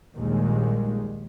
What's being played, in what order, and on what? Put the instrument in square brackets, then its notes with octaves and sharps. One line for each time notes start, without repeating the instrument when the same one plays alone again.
[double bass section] A#1 D#2 D#3 G3 G#3